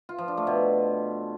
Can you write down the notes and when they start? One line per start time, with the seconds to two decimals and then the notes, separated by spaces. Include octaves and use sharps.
0.09 F4
0.18 F3
0.28 D4
0.37 A3
0.47 B2